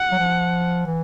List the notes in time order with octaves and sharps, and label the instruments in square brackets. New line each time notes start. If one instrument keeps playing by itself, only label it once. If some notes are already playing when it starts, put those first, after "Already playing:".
Already playing: [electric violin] F#5
[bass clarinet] F#3
F3
E3